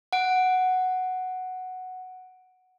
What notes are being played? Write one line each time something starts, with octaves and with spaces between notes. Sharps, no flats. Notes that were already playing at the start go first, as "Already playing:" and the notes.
F#5 D7